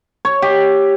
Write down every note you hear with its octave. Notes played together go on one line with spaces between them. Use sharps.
C#5
G4